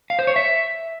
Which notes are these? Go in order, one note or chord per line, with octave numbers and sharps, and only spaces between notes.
F5
C5
C#5
E5